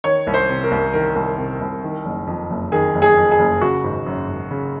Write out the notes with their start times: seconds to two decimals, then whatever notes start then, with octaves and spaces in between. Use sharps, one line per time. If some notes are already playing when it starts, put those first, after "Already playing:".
0.04 D#3 C#5
0.27 C2
0.34 C5
0.49 C3
0.63 A#4
0.71 C2
0.93 D#3 A#4
1.16 C2
1.38 C3
1.61 C2
1.83 D#3
2.05 F#1
2.27 F2
2.50 F#1
2.72 D#3 G#4
2.95 F#1
3.02 G#4
3.17 F2
3.31 G#4
3.39 F#1
3.61 C#3 F#4
3.84 G#1
4.06 F#2
4.28 G#1
4.51 C#3